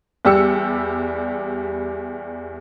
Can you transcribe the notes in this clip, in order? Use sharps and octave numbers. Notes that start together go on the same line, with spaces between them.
E2 G3 G4 E6 C#7